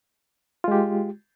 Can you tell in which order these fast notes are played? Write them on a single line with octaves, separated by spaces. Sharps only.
F4 G#3 G4